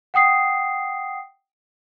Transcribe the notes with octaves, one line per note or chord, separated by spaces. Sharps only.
F#5 G5 D#6 C7